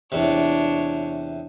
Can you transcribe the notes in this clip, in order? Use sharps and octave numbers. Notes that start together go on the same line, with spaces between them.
E2 C3 D4 C#5